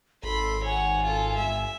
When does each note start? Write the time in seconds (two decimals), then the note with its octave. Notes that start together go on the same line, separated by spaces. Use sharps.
0.23 G#1 A4 B5 C6
0.64 C#5 F#5 G#5
1.04 F4 A4
1.36 G1 E5